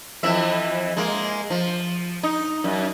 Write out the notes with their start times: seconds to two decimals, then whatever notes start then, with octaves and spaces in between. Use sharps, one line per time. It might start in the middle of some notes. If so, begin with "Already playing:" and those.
0.23 F2 E3 E5
0.97 G#3 A#3
1.50 F3
2.23 D#4
2.64 F#2